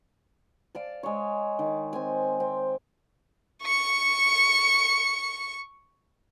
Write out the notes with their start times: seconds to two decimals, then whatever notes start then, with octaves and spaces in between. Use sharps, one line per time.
0.75 D5 F5 A5
1.03 G#3 C#5
1.59 D#3
1.93 C4 G#5
2.40 C4
3.63 C#6 C#7